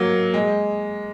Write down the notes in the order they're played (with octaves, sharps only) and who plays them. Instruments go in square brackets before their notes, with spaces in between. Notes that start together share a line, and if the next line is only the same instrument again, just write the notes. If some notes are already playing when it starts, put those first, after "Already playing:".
Already playing: [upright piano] F#3 A#3
G#3